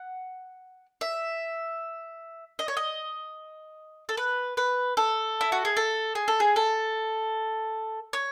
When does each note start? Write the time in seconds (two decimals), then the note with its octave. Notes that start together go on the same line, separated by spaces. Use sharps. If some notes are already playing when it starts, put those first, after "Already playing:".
Already playing: F#5
1.01 E5
2.59 D#5
2.68 C#5
2.77 D#5
4.09 A4
4.17 B4
4.57 B4
4.97 A4
5.41 E4
5.52 F#4
5.65 G#4
5.77 A4
6.15 G#4
6.28 A4
6.40 G#4
6.56 A4
8.13 C#5